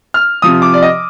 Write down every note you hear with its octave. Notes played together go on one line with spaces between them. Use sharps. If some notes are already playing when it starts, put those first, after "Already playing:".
F6
C3 F3 D#6
D6
D5
D#5